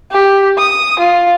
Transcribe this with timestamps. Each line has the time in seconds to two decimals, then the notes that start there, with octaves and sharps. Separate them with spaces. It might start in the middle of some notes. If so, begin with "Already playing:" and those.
0.12 G4
0.58 D#6
0.99 F4